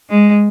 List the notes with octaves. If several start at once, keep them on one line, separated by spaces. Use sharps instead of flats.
G#3